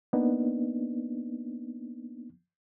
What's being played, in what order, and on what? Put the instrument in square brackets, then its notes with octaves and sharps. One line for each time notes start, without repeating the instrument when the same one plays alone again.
[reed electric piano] A#3 B3 D4 D#4